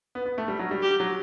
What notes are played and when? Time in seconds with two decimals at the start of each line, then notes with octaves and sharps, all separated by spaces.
0.15 B3
0.26 B3
0.38 A3
0.48 G3
0.59 F#3
0.71 G3
0.82 G4
1.00 F#3